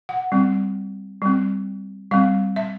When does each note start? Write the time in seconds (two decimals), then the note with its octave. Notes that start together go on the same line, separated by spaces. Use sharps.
0.09 F#5
0.32 G3 C4
1.22 G3 C4
2.11 G3 C4 F5
2.56 E5